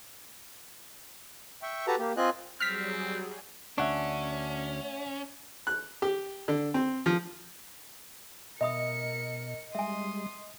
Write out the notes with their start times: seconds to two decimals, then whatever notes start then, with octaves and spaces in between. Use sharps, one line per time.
1.62 E5 G5 C#6
1.87 F#4 G4 A4 B4 A5 A#5
1.99 A#3 G4
2.17 C4 F4 D#5 G#5 F#6
2.60 F#3 G3 C4 G#4 F6 B6
3.78 D2 C#4 D4 E5 F#5 C#6
5.67 F#6
6.02 G4
6.48 D3
6.74 C4
7.06 F3
8.61 B2 A#4 D#5 E5 B5 D#6 C#7
9.75 G3 G#3 E5 G#5 C6 D#6